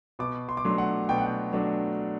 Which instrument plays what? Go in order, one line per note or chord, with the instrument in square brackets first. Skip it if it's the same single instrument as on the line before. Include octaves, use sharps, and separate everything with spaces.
[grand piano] B2 D6
C6
D6
F#3 A3 D4 C6
F#5
B2 G5
F#5
G5
F#3 A3 D4